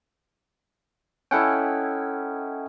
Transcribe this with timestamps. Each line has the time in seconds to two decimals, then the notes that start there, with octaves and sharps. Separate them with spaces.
1.31 C#4 E4 A4 D#5 F#5 G5